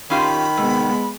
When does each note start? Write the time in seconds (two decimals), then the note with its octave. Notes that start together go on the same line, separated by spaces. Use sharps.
0.10 D#3 C#4 F4 G4 B5
0.57 C3 G#3 B3